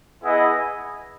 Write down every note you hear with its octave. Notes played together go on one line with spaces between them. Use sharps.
B3 E4 G#4 D#5 F#5